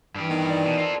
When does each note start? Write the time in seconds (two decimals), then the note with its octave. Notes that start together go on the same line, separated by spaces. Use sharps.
0.15 G2 E3 G4
0.29 D#3 B3
0.49 D#4 E4 D5
0.66 B2
0.78 F4 A4 A#4 C5